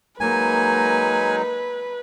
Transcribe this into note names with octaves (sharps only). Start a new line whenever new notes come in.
F#3 G#3 A#3 D#4 B4 G#5